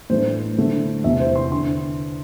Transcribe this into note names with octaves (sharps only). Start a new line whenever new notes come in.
A2 E3 A3 D4 C5
D3 A3 E4
E2 C3 E3 E5
C5
C6
D3 C6